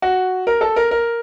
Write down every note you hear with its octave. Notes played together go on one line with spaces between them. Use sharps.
F#4
A#4
A4
A#4
A#4